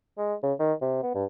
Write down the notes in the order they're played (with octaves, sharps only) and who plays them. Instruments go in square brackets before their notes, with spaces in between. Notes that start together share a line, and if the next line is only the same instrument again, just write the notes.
[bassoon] G#3
C#3
D#3
C3
B3
G2